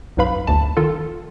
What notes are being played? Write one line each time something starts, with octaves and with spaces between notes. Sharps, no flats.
B1 F#2 D#4 B4 F5 B5
G1 D2 A5
D#3 F4 A4